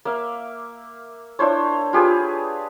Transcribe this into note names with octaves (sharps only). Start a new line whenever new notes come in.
A#3 E5 F5
D4 E4 C5 C#5
F4 G4 G#4 B4